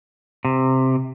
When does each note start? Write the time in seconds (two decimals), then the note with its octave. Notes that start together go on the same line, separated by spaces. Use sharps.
0.45 C3